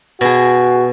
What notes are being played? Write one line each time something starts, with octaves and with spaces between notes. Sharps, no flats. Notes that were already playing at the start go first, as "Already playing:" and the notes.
B2 F#4 G#4